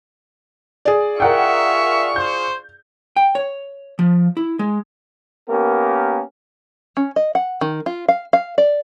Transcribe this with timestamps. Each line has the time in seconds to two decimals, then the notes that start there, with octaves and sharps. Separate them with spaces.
0.85 G#4 D5
1.20 F4 A#4 E5 F#5 G5 C#6
2.16 C5 G6
3.16 G5
3.35 C#5
3.99 F3
4.37 E4
4.59 G#3
5.48 A#3 B3 C#4 G4 A#4
6.97 C#4
7.16 D#5
7.35 F#5
7.61 D#3
7.86 F4
8.08 F5
8.33 F5
8.58 D5